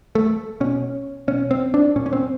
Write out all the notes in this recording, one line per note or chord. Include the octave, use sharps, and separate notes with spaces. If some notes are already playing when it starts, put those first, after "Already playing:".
A3
B2 C#4
B2 C#4
C4
D4
A#2 C#4
C#4
C4